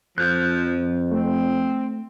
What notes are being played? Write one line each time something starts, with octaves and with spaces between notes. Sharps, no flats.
F2 F3 F#6 G6
A3 C4